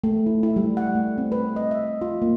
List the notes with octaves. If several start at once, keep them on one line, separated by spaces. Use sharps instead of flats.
A3
E4
E4
G3
F#5
A3
C4
B4
D#5
E5
F4
A#3